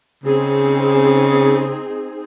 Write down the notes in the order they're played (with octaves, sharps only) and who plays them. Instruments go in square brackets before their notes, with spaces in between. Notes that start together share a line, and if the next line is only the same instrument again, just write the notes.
[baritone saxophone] C#3 [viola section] C4 D#4 G#4